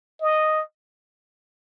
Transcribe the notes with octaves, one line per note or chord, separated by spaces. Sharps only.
D#5